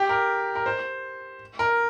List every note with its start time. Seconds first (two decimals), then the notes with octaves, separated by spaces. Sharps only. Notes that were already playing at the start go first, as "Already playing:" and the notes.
Already playing: G4
0.09 A#4
0.56 A#4
0.66 C5
1.59 A#4